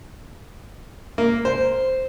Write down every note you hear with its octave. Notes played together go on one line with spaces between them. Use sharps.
A#3
C5